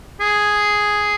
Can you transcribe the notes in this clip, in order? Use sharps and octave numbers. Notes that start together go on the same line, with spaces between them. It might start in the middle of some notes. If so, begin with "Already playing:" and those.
G#4